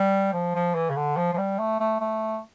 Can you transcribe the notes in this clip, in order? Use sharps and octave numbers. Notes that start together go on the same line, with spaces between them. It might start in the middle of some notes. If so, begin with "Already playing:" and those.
Already playing: G3
F3
F3
E3
C#3
D3
F3
F3
G3
A3
A3
A3